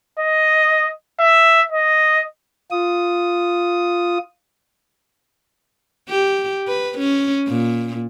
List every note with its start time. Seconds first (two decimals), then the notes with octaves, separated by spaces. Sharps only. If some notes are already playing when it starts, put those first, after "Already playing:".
0.19 D#5
1.19 E5
1.72 D#5
2.71 F4 D#6
6.09 G4
6.68 B4
6.98 C#4
7.48 A#2